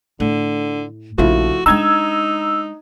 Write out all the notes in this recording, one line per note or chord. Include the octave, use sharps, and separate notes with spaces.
A2 D3
A#1 C#3 F3 A3 E4 F#4
G#3 D4 D#4 A#5 E6 G#6